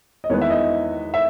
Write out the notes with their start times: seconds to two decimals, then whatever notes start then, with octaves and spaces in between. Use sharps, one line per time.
0.24 D#5
0.30 E2 D#3 G#3 B3 C#5
0.41 E5
0.50 D#5
1.14 E5